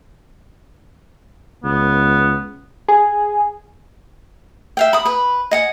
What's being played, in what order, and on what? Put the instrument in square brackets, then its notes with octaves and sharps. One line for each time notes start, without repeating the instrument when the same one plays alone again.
[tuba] C#2 [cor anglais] B3
[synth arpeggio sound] G#4
[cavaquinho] E5 F5 G5
B5 D#6
B4 B5
D#5 F#5 G#5